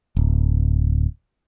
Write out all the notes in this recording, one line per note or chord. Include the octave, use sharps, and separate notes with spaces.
D1